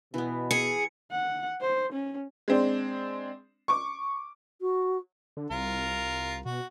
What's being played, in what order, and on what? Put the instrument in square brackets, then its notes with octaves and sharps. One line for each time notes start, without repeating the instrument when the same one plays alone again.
[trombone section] B2 [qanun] E3 B3
[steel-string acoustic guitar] G#4 [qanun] A4 [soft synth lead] C#7
[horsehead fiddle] F#5
C5
C#4
[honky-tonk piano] G#3 C4 D4
C#6 D6
[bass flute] F#4
[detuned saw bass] D3
[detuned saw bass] C2 [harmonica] F4 A#4
[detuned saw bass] B2 [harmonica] F#4